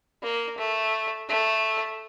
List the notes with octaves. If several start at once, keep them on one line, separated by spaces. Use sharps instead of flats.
A#3
A3
A3